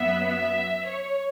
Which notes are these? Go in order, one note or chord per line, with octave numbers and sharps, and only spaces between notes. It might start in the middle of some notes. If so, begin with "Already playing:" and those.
Already playing: F#2 F#3 B3 E5
E5
C#5